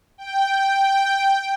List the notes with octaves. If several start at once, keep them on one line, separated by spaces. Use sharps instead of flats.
G5